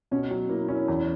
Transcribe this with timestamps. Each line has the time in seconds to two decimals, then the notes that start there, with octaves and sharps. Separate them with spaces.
0.11 B2 C#4
0.31 F#3
0.49 A#3 E4
0.68 C#4 E4
0.88 E2